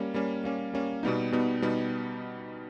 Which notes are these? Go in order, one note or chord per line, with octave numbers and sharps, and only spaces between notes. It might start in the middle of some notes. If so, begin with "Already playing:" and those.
Already playing: G3 A#3 C#4
G3 A#3 C#4
G3 A#3 C#4
G3 A#3 C#4
B2 G3 B3 D#4
B2 G3 B3 D#4
B2 G3 B3 D#4